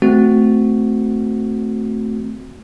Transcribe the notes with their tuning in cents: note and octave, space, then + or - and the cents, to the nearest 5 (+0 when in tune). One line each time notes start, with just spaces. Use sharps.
A3 +0 C4 -10 F#4 +0